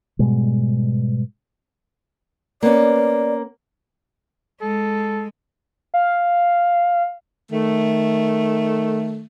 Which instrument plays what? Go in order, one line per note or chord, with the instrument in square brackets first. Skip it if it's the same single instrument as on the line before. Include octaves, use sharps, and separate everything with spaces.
[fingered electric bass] G#2 B2 G3 G#3
[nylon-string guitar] A#3 B3 C#4 [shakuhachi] D5
[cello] G#3 [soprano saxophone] A4
[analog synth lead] F5
[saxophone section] D#3 A3